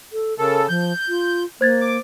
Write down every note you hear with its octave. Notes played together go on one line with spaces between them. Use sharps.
A4
C#3 A4 A#4
F3 G6
F4
A#3 C5 G#6 A6
D6